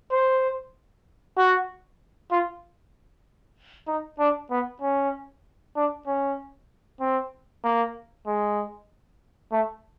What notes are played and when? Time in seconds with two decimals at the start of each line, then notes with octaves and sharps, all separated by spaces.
0.12 C5
1.37 F#4
2.31 F4
3.88 D#4
4.19 D4
4.51 B3
4.82 C#4
5.76 D4
6.07 C#4
7.01 C4
7.64 A#3
8.27 G#3
9.52 A3